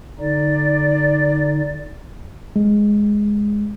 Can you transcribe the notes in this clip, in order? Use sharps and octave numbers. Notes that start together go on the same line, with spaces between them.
D3 D#4 D5
G#3